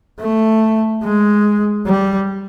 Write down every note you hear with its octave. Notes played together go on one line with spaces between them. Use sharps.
A3
G#3
G3